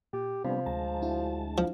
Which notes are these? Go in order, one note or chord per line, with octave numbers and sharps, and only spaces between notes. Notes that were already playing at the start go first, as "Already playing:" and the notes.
A#2 G4
C3 F3 G3 B3 D4
D2 G#3 A5 A#5
D4 E4 F#4
F3